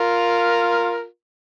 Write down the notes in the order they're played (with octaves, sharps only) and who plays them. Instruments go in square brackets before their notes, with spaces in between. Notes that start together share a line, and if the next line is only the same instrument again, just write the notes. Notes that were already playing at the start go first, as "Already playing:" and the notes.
Already playing: [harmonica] F4 A#4